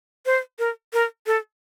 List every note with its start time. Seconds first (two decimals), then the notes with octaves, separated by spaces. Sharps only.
0.26 C5
0.59 A#4
0.93 A#4
1.27 A4